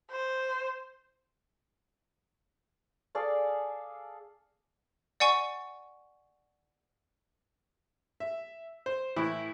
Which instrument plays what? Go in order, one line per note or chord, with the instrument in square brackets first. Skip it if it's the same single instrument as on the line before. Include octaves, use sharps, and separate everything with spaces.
[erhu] C5
[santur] G#4 A4 D5 F5
[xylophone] D5 F#5 G#5 C#6
[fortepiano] E5
C5
A2 E3 E4